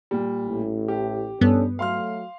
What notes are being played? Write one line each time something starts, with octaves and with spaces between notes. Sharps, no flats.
A#2 G3
A1 A2
G4
G2 B3 C#4 D4 A4
F#3 A3 F5 C6 F6